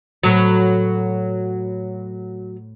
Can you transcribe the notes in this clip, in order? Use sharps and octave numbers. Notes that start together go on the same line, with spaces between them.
A2 F#3 F#4 B4